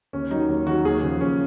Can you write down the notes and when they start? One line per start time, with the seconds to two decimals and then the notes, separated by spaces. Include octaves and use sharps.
0.13 D#2 C#4
0.31 D#3 F#3 D#4
0.49 D#2
0.67 D#3 F#3 F#4
0.84 D#2 G#4
1.03 C#3 F3
1.20 D#2 C#4